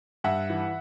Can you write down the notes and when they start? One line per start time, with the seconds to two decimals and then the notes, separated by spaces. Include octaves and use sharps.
0.24 G2 E5 F#5
0.50 E3